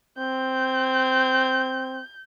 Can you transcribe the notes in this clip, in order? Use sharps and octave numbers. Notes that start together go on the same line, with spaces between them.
C4 G6